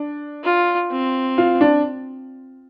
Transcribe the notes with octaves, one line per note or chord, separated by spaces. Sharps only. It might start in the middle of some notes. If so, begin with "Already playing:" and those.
Already playing: D4
F4
C4
F4
D4